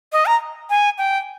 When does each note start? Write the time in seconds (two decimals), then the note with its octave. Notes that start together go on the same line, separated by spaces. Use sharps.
0.12 D#5
0.26 A#5
0.70 G#5
0.98 G5